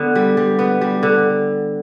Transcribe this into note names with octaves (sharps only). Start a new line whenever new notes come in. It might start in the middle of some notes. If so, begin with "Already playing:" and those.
Already playing: D3 B3
G3
G3
B3
G3
D3